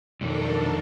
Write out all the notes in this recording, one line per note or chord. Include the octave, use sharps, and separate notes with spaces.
F2 B2 D#3 F#3 D4 A4 A#4 D5